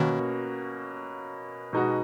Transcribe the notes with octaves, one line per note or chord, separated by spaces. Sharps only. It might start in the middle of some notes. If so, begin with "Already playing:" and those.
Already playing: B2 D#3 A#3 C#4 F#4
B2 G#3 D#4 F#4